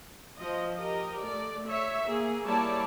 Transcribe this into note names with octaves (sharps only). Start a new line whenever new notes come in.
F3 D#5
G4 A#4 D#5
A3 D5
C#5 E5
A#3 G#4
G3 A#3 E4 C#5 D5 A5